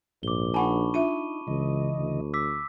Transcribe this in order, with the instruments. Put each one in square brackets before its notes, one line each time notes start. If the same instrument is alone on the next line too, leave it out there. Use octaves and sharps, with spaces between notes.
[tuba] A#1 [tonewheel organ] G#2 [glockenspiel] D6 G7
[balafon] D4 F#5 G#5 [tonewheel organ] D#4 [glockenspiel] A5 B5 C#6
[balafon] D4 F4 E5 [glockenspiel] D#7
[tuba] C#2 [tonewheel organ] C#3 E3 D#5
[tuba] D2
[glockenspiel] D6 E6 B6